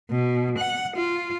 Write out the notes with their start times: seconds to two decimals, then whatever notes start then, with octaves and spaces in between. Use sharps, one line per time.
0.11 B2
0.58 F#5
0.97 F4